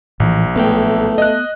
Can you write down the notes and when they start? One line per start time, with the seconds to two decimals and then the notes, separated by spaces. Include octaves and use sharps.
0.20 A#1 A2 E3
0.56 B1 A2 A3 B3 G5
1.18 D#5 F#6